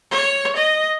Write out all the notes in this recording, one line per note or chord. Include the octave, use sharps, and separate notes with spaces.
C#5
D#5